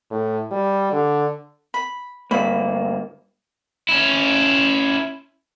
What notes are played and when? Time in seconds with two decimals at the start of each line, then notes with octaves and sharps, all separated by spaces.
0.11 A2
0.52 G3
0.92 D3
1.74 B5
2.31 D2 G2 A#3 B5
3.89 C#4 E4